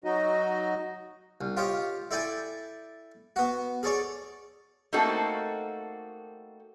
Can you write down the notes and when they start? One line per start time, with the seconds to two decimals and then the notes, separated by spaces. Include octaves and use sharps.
0.04 F#3 D#4 F#4 D#5
1.41 C2
1.57 F4 G4 C#5 D#5
2.11 E4 A4 D5 G5 G#5
3.36 B3 F#4
3.83 G#4 A4 C#5 D5
4.93 A3 A#3 C4 D#4 F#4 A4